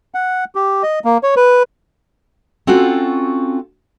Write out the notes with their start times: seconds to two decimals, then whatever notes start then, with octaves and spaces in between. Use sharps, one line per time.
0.14 F#5
0.55 G4
0.83 D#5
1.04 A#3
1.23 C#5
1.36 B4
2.67 C4 C#4 F4 F#4 A4